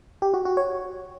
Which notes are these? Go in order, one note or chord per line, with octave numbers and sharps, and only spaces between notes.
G4
F#4
F#4
C#5